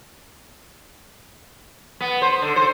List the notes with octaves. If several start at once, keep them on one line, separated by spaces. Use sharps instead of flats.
B3
C5
D3
C5